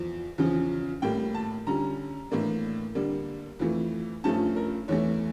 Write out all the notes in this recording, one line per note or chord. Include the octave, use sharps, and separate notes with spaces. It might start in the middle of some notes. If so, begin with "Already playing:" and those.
Already playing: E2 F3
E2 C#3 F3 C#4
A2 G3 A#3 G5
A5
D3 G3 C#4 A#5
A2 E3 A#3 D4
D3 G3 A#3 D4
F2 E3 A3
G2 F3 A3 C#4 A5
A#4
E2 E3 A3 C#5